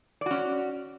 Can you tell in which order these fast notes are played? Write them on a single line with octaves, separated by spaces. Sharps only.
D5 F#4 C#4